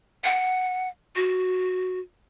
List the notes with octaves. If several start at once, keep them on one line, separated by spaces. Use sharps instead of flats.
F#5
F#4